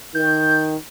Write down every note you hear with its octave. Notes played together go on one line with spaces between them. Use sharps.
D#3 G6